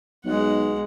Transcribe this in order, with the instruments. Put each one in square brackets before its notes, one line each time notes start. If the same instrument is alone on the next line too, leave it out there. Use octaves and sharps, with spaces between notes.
[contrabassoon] B1 [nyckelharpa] G#3 F#5